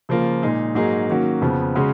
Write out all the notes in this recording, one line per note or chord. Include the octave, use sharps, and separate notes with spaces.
C#3 F3 A#3 F4
A#2 G#3 D#4 G#4
G#2 F#3 A#3 D#4 G#4
D#3 F#3 A#3 C#4 F#4
F2 C#3 F3 B3
C#3 G#3 C#4 F#4